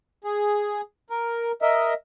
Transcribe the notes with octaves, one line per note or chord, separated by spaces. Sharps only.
G#4
A#4
A#4 D#5 E5